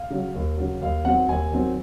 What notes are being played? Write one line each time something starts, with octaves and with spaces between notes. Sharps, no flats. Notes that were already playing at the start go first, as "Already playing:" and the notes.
Already playing: F5
C#3 F#3
D#2
C#3 F#3
D#2 F5
D#3 F#3 C4 F#5
D#2 G#5
D#3 F#3 C4